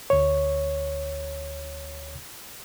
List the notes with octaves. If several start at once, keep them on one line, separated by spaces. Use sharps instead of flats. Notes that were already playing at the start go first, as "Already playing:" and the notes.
D2 C#5